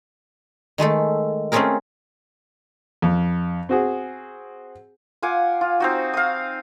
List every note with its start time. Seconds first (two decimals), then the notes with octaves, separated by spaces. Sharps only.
0.78 D#3 G#3 A3 A4
1.52 A3 C4 C#4 F4 G#4 A#4
3.02 F2
3.69 C4 F#4 G#4
5.22 F4 F#5 G#5 D6
5.61 F4
5.80 C4 D#4 F#4
6.14 F5 D#6